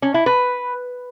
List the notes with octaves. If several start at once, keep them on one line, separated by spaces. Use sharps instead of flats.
C#4
E4
B4